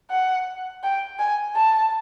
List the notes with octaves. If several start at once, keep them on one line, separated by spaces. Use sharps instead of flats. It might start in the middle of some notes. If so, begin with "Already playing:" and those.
F#5
G5
G#5
A5